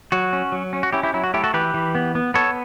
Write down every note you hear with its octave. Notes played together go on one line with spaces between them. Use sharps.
F#3 F#4
C#4
F#3
C#4
F#4
C#4 E4 G4
E4 G4
F#3 E4
F#4
A3 E4 G4
F#4 A4
E3 G4 B4
E3
B3
B3
B3 A4 C#5